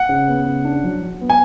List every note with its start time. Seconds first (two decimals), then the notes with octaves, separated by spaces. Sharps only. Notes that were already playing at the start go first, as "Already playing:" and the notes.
Already playing: F#5
0.09 C#3
0.28 B3
0.46 C#3
0.65 D4
0.84 F#3
1.02 F#3
1.21 B3
1.29 G#5